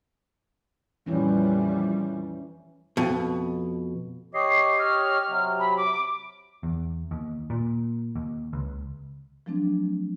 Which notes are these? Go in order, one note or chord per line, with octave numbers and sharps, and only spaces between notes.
F2 A#2 E3 G3 C#4 E4
F2 B2
G4 C#5 D#5 C7
F6
C3 F#3
B5
D6
E2
D#2
A#2
D#2
C#2
F3 F#3 A3 C4 D4